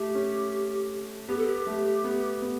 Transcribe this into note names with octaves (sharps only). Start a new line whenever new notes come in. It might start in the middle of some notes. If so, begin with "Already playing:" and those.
Already playing: A3 G4
C#4
B3 G4
A4
G4
A3
B3
B3